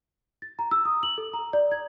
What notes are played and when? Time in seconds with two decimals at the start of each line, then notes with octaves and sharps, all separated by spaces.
0.42 A6
0.59 A#5
0.71 E6
0.85 D#6
1.03 F#7
1.18 A4
1.33 A#5
1.53 D5
1.72 G#6